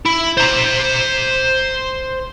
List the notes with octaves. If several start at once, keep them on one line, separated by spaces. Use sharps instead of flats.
E4
C5 A#5